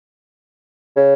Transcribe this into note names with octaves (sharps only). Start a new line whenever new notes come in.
C#3